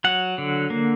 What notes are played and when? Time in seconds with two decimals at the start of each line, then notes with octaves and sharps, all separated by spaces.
0.04 F#3 F#5
0.38 D3
0.70 A#3